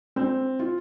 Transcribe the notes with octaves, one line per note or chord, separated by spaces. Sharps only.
C4
F4